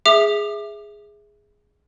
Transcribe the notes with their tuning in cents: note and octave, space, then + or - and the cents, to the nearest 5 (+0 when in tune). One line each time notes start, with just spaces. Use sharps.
G#4 -5 E5 +0 D6 +30